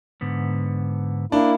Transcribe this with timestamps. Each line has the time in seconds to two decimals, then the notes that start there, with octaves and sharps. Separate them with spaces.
0.21 G#2 D3 B3
1.32 A#3 D4 E4